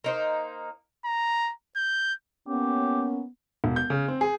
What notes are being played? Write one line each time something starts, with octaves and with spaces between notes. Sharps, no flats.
A#3 D#4 C5
A#5
G6
A#3 B3 C#4 G4
E1
G6
C#3
C4
G#4